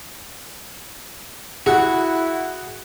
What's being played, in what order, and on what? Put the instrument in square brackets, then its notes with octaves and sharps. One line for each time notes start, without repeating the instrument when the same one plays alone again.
[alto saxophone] E4 [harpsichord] F#4 [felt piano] G#4 F#5